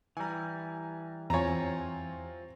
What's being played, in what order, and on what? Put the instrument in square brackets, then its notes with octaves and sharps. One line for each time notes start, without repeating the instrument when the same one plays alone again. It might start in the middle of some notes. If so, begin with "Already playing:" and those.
[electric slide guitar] E3 G3 [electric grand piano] G#5 A#5
[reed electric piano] E2 G#5 [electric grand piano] C4 F4 [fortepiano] C#5 A#5